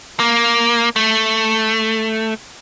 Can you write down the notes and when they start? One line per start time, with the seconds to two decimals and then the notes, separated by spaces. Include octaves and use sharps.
0.20 A#3
0.96 A3